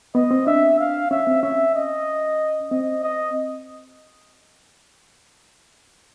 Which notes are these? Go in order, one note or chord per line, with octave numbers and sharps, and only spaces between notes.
B3 D#5
C4
D4 E5
F5
C#4 E5
C4
C#4 E5
D#5
C4 D#5
D#5